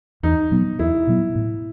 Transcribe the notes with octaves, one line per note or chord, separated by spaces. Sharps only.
E2 D#4
B2 F#3 B3
E2 E4
B2 F#3 B3
A2